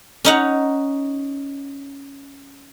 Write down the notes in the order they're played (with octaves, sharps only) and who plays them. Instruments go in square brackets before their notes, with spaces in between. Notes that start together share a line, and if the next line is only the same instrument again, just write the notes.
[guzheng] C#4 D#4 F#5